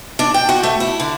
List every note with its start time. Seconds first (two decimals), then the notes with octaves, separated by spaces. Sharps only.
0.19 D4
0.34 G5
0.49 F#4
0.63 A3
0.80 E4
1.00 D3